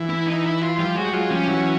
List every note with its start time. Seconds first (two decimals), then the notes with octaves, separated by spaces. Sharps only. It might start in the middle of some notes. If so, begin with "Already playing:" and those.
Already playing: E3
0.09 E4
0.27 D#4
0.44 E4
0.62 F4
0.78 F3 G3 F4
0.95 F#3 G#3 F#4
1.06 G3
1.13 F#3 G#3 F4
1.30 F3 G3 C#4
1.47 E3 F#3